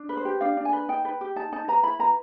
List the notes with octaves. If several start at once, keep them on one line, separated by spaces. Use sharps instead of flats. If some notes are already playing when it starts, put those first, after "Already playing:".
Already playing: D4
B4
C5
G4
D4 F5
D4
G#5
B4
D#4 G5
B4
G4
D#4 A5
D#4 A5
B4 A#5
E4 B5
B4 A#5